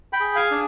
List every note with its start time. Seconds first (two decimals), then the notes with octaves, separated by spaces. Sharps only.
0.13 G5 B5
0.20 G#4
0.35 F5 G#5
0.51 D4